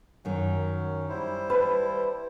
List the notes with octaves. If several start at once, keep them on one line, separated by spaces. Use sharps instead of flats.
F#2 D#3 F#3 C#4
G3 E4 C5
B4 A5 B5